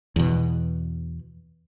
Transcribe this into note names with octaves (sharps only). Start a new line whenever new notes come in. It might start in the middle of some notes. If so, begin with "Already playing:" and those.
E2 B2